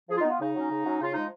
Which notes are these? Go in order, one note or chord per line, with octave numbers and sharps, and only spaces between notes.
F3 G#4
F4
B3 D#4
F4
C#3 D#4
F#3 C#4
C#3
F#3 C#4
C#3 F4
F3 G#3 D#4